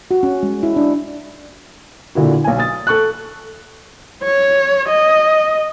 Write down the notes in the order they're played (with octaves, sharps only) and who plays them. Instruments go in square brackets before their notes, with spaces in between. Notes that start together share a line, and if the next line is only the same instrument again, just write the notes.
[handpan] F#4
C#4
G#3
E4
D4
[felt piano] A#2 D3 E4 F#4
B1 G#5
D#6 A6
A4 C#6 F#6
[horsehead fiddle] C#5
D#5